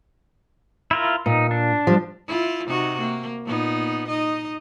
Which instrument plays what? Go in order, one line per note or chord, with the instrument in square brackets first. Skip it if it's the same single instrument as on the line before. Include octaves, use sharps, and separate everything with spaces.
[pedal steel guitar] E4 F4 A#4
[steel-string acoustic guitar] A#2 [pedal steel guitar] D#4
[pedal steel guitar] D4
[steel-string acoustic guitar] F3 G3
[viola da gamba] E4 F4
C3 D#4 F#4
A#3
A#2 B3 D#4
D#4 D#5